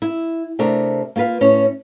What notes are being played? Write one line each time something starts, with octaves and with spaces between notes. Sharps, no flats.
E4
C3 A3 D4 A#4
A#3 F4 A4 B4 F5
A2 C#4